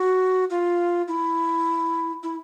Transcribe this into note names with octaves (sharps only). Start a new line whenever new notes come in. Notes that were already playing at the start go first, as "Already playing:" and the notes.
Already playing: F#4
F4
E4
E4